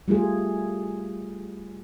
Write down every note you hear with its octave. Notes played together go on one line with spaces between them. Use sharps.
G3 A3 F4 G#4